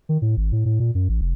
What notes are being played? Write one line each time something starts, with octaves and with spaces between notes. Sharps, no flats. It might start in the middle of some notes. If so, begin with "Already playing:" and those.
D#3
A2
G#1
A2
A2
A#2
F#2
A1
F1